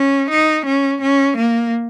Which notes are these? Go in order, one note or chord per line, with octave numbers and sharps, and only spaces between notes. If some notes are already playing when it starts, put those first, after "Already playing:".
Already playing: C#4
D#4
C#4
C#4
A#3